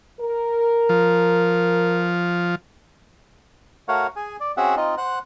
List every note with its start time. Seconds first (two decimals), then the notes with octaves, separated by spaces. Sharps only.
0.20 A#4
0.89 F3
3.88 A3 F#4 A#4 C#5 F5 F#5
4.16 G#4 G#5
4.40 D5
4.57 C4 C#4 F#4 G#4 E5 F#5
4.77 C4 D#4 F4 D#5
4.97 C5 F#5 F#6